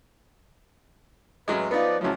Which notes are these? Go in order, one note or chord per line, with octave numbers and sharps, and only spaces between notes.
A1 F#3 G#3 B4
F3 B3 D#4 B4 D5
C#2 F3 F#3 A3 E4